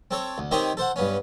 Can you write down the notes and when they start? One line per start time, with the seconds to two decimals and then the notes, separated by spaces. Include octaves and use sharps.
0.11 C4 A4 C#5
0.38 D2
0.51 D#3 C4 G4 C5 C#5 D#5
0.77 A4 C5 F#5
0.96 G2 B3 C#4